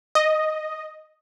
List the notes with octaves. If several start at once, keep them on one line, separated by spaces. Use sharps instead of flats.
D#5